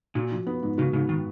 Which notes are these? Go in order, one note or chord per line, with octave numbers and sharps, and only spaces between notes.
A#2 F#4
F3
B3
G#2
C#3 F#4
G#2 C#3
D#3